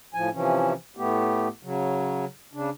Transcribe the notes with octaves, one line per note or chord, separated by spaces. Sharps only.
A2 F3 G#5
C3 E3 F3 C#4
A2 A3 B3 G4
C#3 F#3
C#3 D4